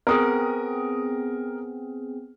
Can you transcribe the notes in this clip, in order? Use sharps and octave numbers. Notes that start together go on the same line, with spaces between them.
B3 C4 G#4 A#4 D#6